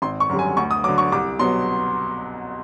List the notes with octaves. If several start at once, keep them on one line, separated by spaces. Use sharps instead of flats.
G#1 C6
C#6
F#2 D3 G3
G#5
D2 C#6
D#6
D3 F#3 D6
C#6
C2 D6
B2 F#3 B3 C6